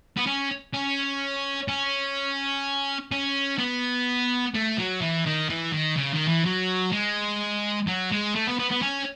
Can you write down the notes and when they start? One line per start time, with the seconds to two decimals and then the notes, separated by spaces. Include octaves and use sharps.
0.17 B3
0.27 C#4
0.74 C#4
1.68 C#4
3.12 C#4
3.59 B3
4.55 A3
4.78 F#3
5.01 E3
5.26 D#3
5.50 E3
5.73 D#3
5.97 C#3
6.14 D#3
6.28 E3
6.45 F#3
6.92 G#3
7.87 F#3
8.12 G#3
8.35 A3
8.47 B3
8.59 B3
8.71 B3
8.82 C#4